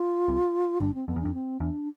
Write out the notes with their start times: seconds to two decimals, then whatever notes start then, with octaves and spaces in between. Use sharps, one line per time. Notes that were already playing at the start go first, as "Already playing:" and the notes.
Already playing: F4
0.28 C2 C3
0.80 G1 G2 D4
0.94 C4
1.08 F2 B3
1.16 E2
1.21 F2 D4
1.34 C4
1.60 E2 D4